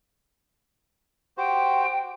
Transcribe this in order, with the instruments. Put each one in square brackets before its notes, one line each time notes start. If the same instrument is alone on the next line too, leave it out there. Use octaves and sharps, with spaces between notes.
[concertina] F#4 G4 C5 [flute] G5